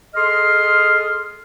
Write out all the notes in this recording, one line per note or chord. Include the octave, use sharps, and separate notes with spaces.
G#4 A4 D#5 C6 D#6 F6